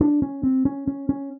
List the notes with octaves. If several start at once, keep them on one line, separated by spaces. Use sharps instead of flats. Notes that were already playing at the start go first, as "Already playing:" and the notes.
D4
C#4
C4
C#4
C#4
C#4